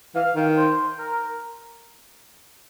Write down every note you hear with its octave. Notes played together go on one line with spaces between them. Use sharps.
E3 F5
D#3
C5
A#4